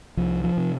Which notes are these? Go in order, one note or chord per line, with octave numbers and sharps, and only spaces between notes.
C2 F3
F3
C3